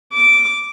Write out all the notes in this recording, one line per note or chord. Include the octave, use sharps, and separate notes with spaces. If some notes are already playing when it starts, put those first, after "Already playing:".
D6